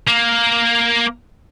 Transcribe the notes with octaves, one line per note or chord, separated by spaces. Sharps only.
A#3